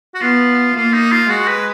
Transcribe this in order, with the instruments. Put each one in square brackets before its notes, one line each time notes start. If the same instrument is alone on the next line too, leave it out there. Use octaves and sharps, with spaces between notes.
[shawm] F#4
[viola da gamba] B3 [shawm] F4
[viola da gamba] A#3 [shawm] F4
[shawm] D#4
F4
[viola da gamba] G#3 [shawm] F#4
[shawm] B4